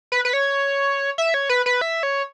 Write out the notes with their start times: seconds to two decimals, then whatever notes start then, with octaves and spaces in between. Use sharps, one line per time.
0.12 B4
0.25 B4
0.33 C#5
1.18 E5
1.34 C#5
1.49 B4
1.66 B4
1.81 E5
2.03 C#5